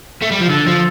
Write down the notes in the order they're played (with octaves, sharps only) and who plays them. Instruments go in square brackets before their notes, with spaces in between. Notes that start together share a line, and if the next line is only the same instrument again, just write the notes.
[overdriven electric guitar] A3
G3
F3
[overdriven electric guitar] D3 [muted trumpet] A4
[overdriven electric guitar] F3